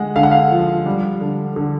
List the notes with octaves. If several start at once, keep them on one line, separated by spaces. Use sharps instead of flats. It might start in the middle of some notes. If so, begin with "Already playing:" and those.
Already playing: D3 G#3 F#5
D3 F5
F#5
F5
F3
G3
D3
D3